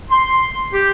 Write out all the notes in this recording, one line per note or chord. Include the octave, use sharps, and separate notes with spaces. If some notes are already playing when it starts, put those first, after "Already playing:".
C6
G4